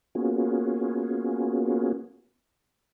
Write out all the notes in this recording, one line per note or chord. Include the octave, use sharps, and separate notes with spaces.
A#3 B3 C#4 F4 F#4 G#4